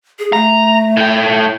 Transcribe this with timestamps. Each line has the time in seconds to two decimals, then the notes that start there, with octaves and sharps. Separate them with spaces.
0.19 G#4
0.33 A3 A#5
0.97 A2 G5